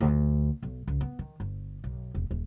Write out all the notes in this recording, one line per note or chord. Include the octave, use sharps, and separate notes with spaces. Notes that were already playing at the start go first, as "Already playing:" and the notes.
D2
B1
C#2
B3
D#3
G1
B1
E1
D#1